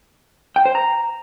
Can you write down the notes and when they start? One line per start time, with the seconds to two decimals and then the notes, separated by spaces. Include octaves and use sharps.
0.56 G5
0.66 C5
0.75 A#5